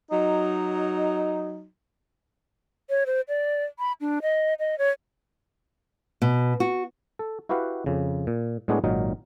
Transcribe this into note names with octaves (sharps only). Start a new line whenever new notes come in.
F#3 D#4
C#5
C5
D5
B5
D4
D#5
D#5
C#5
B2
F#4
A4
E4 F#4 G4 B4 F5 F#5
F2 C#3
A#2
A2 G#3 B3 D4 F#4 G#4
G#1 A#2 F#3 D#4 A#4